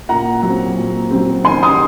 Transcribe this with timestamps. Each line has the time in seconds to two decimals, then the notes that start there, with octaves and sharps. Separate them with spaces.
0.09 A#2 F#5 A#5
0.43 F#3 C4
0.77 A#2
1.11 F#3 C4
1.45 D#3 G#5 C6
1.63 C6 D#6